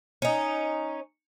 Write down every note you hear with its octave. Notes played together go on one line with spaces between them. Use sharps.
C#4 D#4